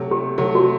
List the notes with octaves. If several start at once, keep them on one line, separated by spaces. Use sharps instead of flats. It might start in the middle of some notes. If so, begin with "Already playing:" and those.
Already playing: C3 F#3 A3
G4
C3 F#3 A3 G4
F#4